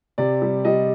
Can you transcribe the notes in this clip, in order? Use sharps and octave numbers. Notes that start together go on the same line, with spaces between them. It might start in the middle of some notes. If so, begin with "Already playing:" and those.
C3 D5
G3
G3 D#5